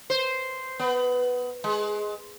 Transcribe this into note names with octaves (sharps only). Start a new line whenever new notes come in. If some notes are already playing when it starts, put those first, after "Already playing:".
C5
B3
G#3